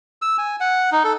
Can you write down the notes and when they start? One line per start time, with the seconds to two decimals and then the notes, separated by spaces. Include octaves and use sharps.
0.22 E6
0.38 G#5
0.60 F#5
0.92 D#4
1.04 A4